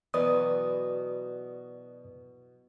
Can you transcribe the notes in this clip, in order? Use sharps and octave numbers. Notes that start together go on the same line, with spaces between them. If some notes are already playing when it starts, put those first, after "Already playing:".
B2 E3 F#3 B4 D5 D#6